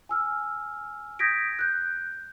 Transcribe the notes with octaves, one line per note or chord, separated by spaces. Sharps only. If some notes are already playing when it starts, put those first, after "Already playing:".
G#5 E6 F6
D#6 G6 G#6 A#6 B6 D7
F#6 G6